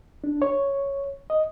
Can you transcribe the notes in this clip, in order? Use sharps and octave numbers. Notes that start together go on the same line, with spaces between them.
D4
C#5
D#5